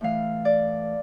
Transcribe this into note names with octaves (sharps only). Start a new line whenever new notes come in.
A2 E3 A3 F5
D5